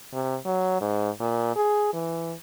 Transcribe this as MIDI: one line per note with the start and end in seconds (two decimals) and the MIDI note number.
0.13 0.36 48
0.45 0.80 54
0.81 1.10 44
1.20 1.54 46
1.56 1.90 68
1.93 2.34 52